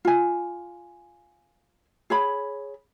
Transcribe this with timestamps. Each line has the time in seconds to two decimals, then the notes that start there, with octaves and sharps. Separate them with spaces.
0.05 F4 G#5
2.10 G#4 C#5 B5